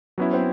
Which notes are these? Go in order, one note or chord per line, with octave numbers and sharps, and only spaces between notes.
F#3 B3 C#4 E4
C4